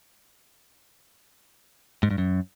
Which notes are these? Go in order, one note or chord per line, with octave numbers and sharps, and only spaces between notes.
G#2
G2
F#2